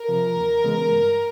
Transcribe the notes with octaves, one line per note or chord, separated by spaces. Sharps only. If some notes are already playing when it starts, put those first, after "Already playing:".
Already playing: A#4
C3 F3
D#2
C#3 E3 G#3 B3
G2